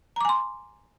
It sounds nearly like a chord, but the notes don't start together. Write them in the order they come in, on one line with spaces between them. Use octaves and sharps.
A#5 D6 G#5 C6